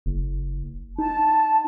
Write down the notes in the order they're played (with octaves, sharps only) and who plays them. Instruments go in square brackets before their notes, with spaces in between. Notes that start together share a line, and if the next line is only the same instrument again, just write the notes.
[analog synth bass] F#1
[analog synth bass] D#4 [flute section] A5